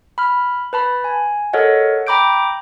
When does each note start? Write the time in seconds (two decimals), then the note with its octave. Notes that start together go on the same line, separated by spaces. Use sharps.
0.18 B5 F6
0.73 B4 A5 B5
1.04 G#5
1.53 A4 A#4 C#5 D#5 F#5
2.07 G5 A#5 B5 D6 G6 D7